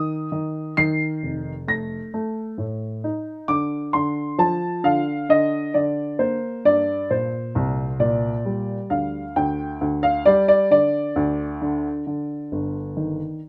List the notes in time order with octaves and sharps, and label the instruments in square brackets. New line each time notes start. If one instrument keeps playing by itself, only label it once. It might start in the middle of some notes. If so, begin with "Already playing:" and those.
Already playing: [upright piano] D#3 D#6
D#3
D#3 C7
F1
A3 A#6
A3
A2
D#4
D3 D6
D3 C6
F3 A5
D3 F5
D3 D#5
D3 D5
A#3 C5
G2 D5
A#2 C5
C2
A#2 D5
G3
D2 F5
D2 G5
D2
F5
G3 D5
D5
D3 D5
D2
D3
D3
G1
D#3